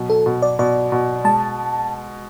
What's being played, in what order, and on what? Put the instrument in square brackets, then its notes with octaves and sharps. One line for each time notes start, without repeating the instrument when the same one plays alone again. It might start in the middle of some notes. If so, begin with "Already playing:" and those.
Already playing: [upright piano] B2 F#3
[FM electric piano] A4
[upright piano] B2
[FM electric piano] D5
[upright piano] B2 [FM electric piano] D5
[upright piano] B2
[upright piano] G#3 [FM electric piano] A5